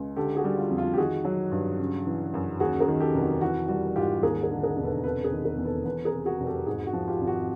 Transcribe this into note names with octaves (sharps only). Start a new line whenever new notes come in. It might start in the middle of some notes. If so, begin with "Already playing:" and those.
Already playing: C#2 G#3
D3 G4 A4
F#4 G#4
G3
F4
F2
F4
G4
D#3 F#4 G#4
F#3
G2
C#3
E3
F#2
D#2 F#4 G#4
G#4 A#4
D#3
G4 A4
F1
F#4
E3 F#4
G3 F#4
G#2 F4 G4
D#2 G#4 A#4
G#4 A#4
D3
G#4 A#4
E1
A4 B4
C3 A4 B4
G#4 A#4
D#3
G#4 A#4
E2
A4 B4
E2 A4 B4
G#4 A#4
C3
F#4 G#4
F1
G4 A4
G#2 F#4 G#4
F#4
F3
F4 G4
G#1
F#4